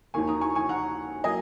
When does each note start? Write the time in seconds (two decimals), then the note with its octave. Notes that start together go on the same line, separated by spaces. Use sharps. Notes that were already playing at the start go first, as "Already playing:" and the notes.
0.14 D#2 D#3 A#3 G#5 C#6
0.27 A#5 D#6
0.41 G#5 C#6
0.55 G#5 C#6
0.69 F#5 A#5
1.24 F#3 A#3 D#5 G#5